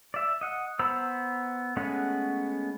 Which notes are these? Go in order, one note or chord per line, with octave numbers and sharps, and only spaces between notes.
D5 E5
D#5 F#5
B3 C5 A#5 B5 E6
G#3 A3 B3 C#4 F#5